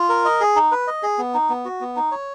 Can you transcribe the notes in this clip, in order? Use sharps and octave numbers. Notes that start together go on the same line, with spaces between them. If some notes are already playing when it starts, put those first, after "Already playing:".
Already playing: F4
A#4
D#5
G#4
D#4
B4
D#5
G#4
B3
D#4
B3
F#4
B3
D#4
C#5